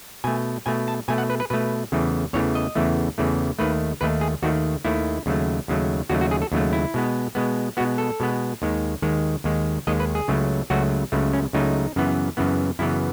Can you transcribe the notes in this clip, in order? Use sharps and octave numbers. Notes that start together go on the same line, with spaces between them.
B2 A3 G#5
B2 A3 G#5
A5
B2 A3 G#5
F#5
B4
B4
B2 A3 B4
E2 C#3 E3 A3
E2 C#3 E3 A3 C#5
D#5
E2 C#3 E3 A3
E2 C#3 E3 A3
D#2 D#3 A3 B4
D#2 D#3 A3 B4
G#4
D#2 D#3 A3 F#4
D#2 D#3 A3 E4
D#2 C#3 F#3 A3
D#2 C#3 F#3 A3
D#2 C#3 F#3 A3 F#4
F#4
G#4
A4
D#2 C#3 F#3 A3
E4
B2 G#3 B3
B2 G#3 B3
B2 G#3 B3 F#4
A4
B2 G#3 B3
D#2 D#3 G#3
D#2 D#3 G#3
D#2 D#3 G#3
D#2 D#3 G#3 D#5
B4
G#4
C#2 C#3 F#3 A3
C#2 C#3 F#3 A3 F#4
C#2 C#3 F#3 A3
C#4
C#2 C#3 F#3 A3 D#4
F#2 C#3 E3 B3
F#2 C#3 E3 B3
F#2 C#3 E3 B3 E4